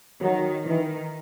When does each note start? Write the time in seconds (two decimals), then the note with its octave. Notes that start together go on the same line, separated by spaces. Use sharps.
0.21 D#3 F#3
0.66 D#3 E3